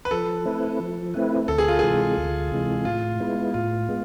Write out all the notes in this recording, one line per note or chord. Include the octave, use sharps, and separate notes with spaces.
B4
F3 A4
A3 C4 E4 B4
F3
A3 C4 E4 B4
D2 A4
G#4
F4
C3 E3 G#3 G#4
D2
C3 E3 G#3
A2 F4
G#3 B3 E4
A2 F4
G#3 B3